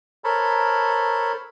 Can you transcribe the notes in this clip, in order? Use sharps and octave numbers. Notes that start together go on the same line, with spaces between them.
A4 A#4 C5 C#5 A5 B5